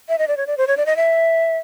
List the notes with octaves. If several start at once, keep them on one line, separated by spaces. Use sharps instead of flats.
E5
D#5
D5
C#5
D5
C5
C#5
D5
D#5
E5